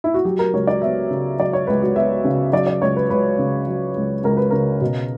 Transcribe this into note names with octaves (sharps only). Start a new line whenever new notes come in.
E4
F#4
F#3 G4
A#4
C#2 C#5
D5
B3 E5
C#3
F#3 D5
C#5
C#2 B4
F#4
B3 E5
C#3
F#3 D5
D5
C#2 C#5
B4
C#2 B4
C#3
F#3
C#2
C#2 A#4
B4
C#3 A#4
B2